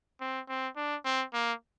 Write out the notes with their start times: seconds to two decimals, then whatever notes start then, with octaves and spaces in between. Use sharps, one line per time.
0.21 C4
0.49 C4
0.76 D4
1.05 C4
1.34 A#3